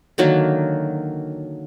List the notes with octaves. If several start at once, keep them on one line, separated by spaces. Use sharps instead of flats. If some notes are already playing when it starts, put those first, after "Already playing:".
D3 D#3 F#3 A#3